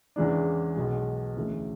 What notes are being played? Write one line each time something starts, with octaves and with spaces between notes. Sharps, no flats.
E2 C#3 E3 G#3 D4
B1 B2 G#3
D2 C#3 E3 A3